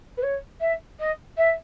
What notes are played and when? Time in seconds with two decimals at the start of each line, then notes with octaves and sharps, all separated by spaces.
0.17 B4
0.22 C#5
0.60 E5
0.99 D#5
1.37 E5